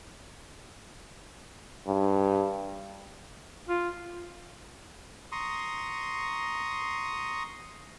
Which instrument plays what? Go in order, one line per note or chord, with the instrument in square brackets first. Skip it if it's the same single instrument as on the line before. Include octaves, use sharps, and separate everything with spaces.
[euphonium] G2
[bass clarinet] F4
[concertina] A#5 C6 C#6 D#6